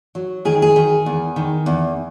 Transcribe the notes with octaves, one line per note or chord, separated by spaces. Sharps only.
F#3
D#3 G#4
G#4
D#3
E2
D#3
E2